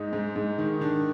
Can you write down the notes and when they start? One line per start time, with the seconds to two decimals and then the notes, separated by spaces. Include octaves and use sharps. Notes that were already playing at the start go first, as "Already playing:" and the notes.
Already playing: G#2 D#4
0.13 G#2
0.36 G#2
0.58 D#3
0.81 D#3 D4